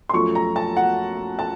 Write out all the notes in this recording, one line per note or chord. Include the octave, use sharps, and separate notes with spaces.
C6
F#2 F3 A3 C#6
A#5
A5
F#5
A5